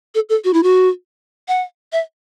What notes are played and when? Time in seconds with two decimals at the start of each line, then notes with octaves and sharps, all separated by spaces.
0.15 A4
0.29 A4
0.44 F#4
0.53 E4
0.63 F#4
1.48 F#5
1.92 E5